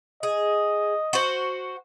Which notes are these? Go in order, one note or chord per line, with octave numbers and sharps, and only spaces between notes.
G#4 D#5
F#4 C5